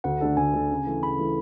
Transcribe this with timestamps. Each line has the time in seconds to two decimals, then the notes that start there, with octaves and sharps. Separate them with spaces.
0.04 D2 F#5
0.21 D3 A3 D4 A4
0.37 D2 G#5
0.53 D3 A3 D4 A4
0.70 C#3
0.87 E3 A3
1.02 C#3 B5
1.19 E3 A3